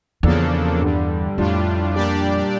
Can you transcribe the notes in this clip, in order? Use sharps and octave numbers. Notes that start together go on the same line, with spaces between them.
E2 C#3 F3 A#3 D4 A4
G2 D3 G3
F2 A2 G3 D4 F4
A#2 G3 D4 G4 D5